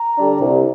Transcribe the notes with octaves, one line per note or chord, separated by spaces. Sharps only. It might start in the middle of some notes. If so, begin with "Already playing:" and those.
Already playing: A#5
D3 G3 D4
C2